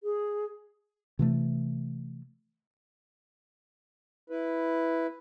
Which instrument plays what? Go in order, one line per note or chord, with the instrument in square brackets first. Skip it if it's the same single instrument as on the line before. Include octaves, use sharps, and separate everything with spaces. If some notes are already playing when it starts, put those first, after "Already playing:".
[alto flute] G#4
[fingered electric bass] C3 E3 A3
[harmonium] E4 B4